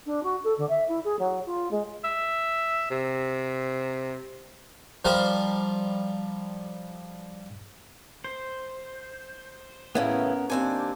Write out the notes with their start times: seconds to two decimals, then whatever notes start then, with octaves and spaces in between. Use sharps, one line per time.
0.05 D4
0.23 F#4
0.43 A4
0.57 D3
0.68 E5
0.87 E4
1.04 G#4
1.19 F#3
1.45 F4
1.71 G#3
2.04 E5
2.90 C3
5.05 F3 G3 A#4 C5
8.24 C5
9.95 A2 C#3 E3 B3 C#4 A#4
10.50 D#2 C4 D4 G#5